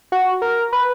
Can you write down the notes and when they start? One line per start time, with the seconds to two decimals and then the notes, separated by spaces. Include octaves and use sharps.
0.12 F#4
0.42 A#4
0.73 B4